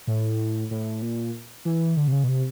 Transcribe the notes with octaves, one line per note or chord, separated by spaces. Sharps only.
A2
A2
A#2
E3
D3
C3
C#3
B2
C3